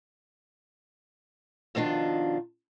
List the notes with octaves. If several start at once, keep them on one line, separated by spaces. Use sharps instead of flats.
F2 B2 D#3 D4 F4